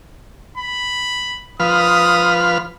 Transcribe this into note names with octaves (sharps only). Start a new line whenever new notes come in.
B5
F3 B4 D#6 F6